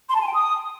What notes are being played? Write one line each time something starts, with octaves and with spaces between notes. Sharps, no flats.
C6
A5
G#5
G5
D#6